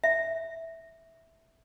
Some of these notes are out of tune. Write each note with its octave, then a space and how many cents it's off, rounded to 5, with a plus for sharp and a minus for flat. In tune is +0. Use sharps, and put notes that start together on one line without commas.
E5 -5